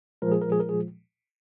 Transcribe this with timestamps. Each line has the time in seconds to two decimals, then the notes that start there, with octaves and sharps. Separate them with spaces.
0.22 A#2 F3 G#3 A#4
0.32 G#4
0.41 A#4
0.52 G#4
0.60 A#4
0.69 G#4